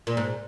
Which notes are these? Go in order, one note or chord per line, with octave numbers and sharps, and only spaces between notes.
A#2
G#2